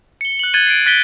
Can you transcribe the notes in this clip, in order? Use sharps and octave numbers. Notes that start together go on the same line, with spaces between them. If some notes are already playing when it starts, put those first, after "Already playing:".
C#7 G7
F#6 F#7
F#6 G#6 A6 D#7 G7
C7 D7
F#6 A6 B6 D7 G7